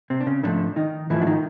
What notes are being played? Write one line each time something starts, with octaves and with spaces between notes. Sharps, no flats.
C3 C4
D4
C#3 C#4
G#2 D3 F3 A3 D4
D#3 D#4
G#2 E3 F3 A3 E4
D4
D#3 D#4